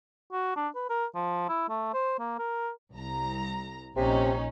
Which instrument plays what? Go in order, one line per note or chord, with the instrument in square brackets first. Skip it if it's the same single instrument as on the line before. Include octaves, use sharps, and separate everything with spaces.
[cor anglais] F#4
D4
B4
A#4
F3
E4
A3
C5
A#3
A#4
[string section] C2 A#5
[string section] A#1 C#4 D#4 [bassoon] C3